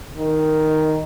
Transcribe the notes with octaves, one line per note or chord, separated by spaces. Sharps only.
D#3